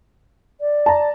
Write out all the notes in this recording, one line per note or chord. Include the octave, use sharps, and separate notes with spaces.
D5
A5 A#5